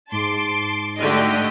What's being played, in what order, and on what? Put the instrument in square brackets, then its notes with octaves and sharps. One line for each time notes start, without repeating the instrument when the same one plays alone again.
[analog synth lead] G#2 [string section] A5 C6 D6
[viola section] D3 A3 [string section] F#4 G4 D#5